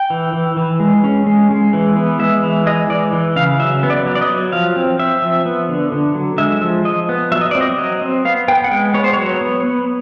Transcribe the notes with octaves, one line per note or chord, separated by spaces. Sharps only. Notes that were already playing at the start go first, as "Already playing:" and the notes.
Already playing: G5
E3
E3
E3
G#3
C#4
G#3
G#3
E3
B3
G#3 E5
E3
G#3 D#5
E3 D5
E3
C#3 F5
F#3 E5
B3
D5
F#3
D5
D#5
F#3
F3 F5
C4
C4 E5
F3
B3
D3
D3
F#3
G#3 E5
F3
F3 D#5
B3
F#3 E5
D#5
C4 D5
D#5
F#3 D#5
C4
B3 F5
B3 G5
F#5
G#3 G5
B3 C#5
C5
F#3 C#5
B3
B3